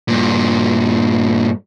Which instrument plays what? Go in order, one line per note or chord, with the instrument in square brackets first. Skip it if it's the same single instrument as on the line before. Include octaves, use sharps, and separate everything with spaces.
[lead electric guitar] G2 A#2